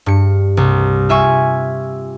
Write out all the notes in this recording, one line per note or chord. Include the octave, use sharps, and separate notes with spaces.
G2 C#7
C2
F4 E5 G#5 C#6